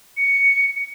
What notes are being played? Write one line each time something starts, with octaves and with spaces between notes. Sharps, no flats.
C#7